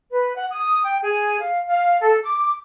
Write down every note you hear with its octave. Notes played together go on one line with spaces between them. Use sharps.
B4
F#5
D#6
G5
G#4
F5
F5
A4
D6